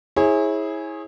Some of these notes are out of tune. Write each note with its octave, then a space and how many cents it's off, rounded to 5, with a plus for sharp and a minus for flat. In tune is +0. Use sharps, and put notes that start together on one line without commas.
E4 -25 G#4 +0 C#5 -35